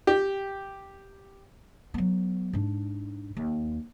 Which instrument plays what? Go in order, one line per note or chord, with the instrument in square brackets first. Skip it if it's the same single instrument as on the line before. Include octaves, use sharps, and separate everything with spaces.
[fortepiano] G4
[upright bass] F#3 B3
G#2 D4
D#2